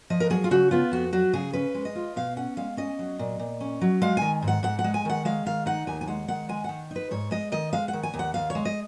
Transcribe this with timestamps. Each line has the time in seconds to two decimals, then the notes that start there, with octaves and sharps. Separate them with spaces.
0.10 F3 D#5
0.20 A#4
0.30 F#3 G#4
0.44 F4
0.51 C#3 F#4
0.71 B3 F4
0.92 F2 F#4
1.13 F#3 F#4
1.33 C#3 G#4
1.53 C#4 B4
1.75 G#3
1.85 D#5
1.95 F4
2.16 B2 F5
2.37 C#4 F#5
2.57 G#3 F5
2.77 C#4 D#5
2.99 F#3
3.19 A#2
3.39 A#2
3.61 C#4
3.81 F#3
4.02 G#3 F5
4.17 D#3 G#5
4.42 G#2
4.48 F#5
4.63 G#2 F#5
4.79 F#5
4.84 G#3
4.94 G#5
5.05 D#3 F#5
5.25 G#3 F5
5.46 D#3 F5
5.66 D#4 F#5
5.87 D#2 G#5
6.01 G#5
6.08 G#3 F#5
6.28 D#3 F#5
6.49 G#3 G#5
6.64 D#3 F#5
6.91 D#4 B4
7.11 G#2 C#5
7.31 G#3 D#5
7.52 D#3 D#5
7.73 G#3 F5
7.88 F#5
7.93 D#3
8.03 G#5
8.14 D#2
8.19 F#5
8.34 D#2 F5
8.50 C#5
8.55 G#3
8.65 D#5